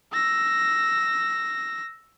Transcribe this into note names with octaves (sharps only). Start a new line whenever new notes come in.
E6 A#6